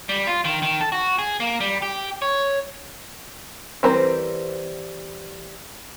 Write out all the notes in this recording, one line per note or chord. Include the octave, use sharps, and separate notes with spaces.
G3
F4
D#3
D#3
A4
F#4
G#4
A#3
G3
G4
C#5
E3 G3 C4 A#4 C5